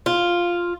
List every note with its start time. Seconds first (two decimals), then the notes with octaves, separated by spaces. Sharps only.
0.06 F4